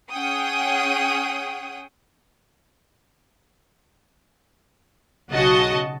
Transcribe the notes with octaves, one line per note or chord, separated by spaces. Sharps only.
C#4 G#4 F#5 G5 D#6
B1 C#3 F#4 D#5 A5